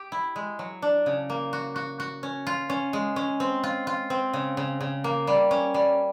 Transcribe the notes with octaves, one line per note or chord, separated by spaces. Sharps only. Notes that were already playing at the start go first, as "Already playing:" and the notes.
Already playing: G4
E4
G#3
F#3
D4
C#3
A#3
F#4
F#4
F#4
C#4
F4
C#4
G#3
C#4
C4
F4
F4
C4
C#3
C#3
C#3
A#3
G3
C#4
G3